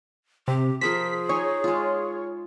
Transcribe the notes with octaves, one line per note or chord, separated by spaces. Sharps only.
C3 G4
F3 G#4 A#4 C5 B6
D#4 C#5 G#5
G#3 F4